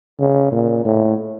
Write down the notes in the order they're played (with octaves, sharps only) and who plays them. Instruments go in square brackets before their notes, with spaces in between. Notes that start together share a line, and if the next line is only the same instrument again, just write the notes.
[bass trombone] C#3
A#2
A2